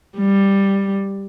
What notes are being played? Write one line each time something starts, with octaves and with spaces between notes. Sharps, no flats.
G3